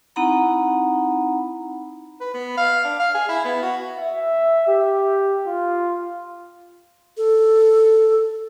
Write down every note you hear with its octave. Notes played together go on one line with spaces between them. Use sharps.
C4 D#4 E4 F#5 A#5 B5
B4
B3
F5
D4
F5
G#4
E4
B3
F#4
E5
G4
F4
A4